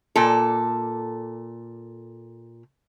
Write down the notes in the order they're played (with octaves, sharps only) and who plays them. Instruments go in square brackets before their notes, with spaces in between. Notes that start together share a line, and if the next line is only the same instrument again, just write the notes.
[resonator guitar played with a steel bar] A#2 A4